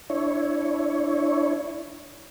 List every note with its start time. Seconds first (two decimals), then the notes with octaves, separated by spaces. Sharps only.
0.10 D4 E4 C#5